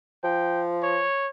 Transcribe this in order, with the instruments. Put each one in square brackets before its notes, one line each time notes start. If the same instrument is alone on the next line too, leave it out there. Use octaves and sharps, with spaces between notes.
[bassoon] F3 [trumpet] G5
[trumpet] C#5